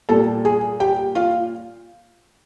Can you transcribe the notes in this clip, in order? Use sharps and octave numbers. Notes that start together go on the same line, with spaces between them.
A#2 G3 A4 A5
G#4 G#5
G4 G5
F4 F5